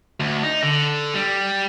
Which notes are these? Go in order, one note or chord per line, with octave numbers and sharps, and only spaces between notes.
D2
D#4
D3
G3